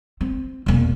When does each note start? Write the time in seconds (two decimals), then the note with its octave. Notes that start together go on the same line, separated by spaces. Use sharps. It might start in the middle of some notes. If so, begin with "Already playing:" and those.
0.21 C4
0.66 E1 A#3